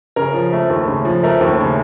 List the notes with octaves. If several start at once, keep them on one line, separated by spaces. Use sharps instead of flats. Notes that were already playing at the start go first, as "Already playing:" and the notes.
C#3 A#4
F3
A3
D#2
C#3
F3
A3 A#4
D#2
C#3